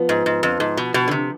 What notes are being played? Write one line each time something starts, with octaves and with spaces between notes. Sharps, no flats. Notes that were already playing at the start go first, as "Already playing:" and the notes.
Already playing: F3 B3
G#2
G#2
F2
G#2
B2
B2
D3
C3